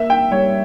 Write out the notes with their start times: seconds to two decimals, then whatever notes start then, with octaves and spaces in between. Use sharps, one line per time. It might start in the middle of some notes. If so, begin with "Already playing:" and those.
Already playing: A#3 E5
0.10 G5
0.31 G3 C#5